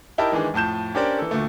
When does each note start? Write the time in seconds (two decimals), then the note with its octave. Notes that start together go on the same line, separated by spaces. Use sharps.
0.18 D#4 E4 G4 A#4 A5
0.32 D#3 E3 G#3 D4 G#4
0.54 F2 A2 A5 G6 E7
0.95 C#4 D4 G4 A#4 C5 D5
1.19 E3 A4
1.31 D2 A#2 A3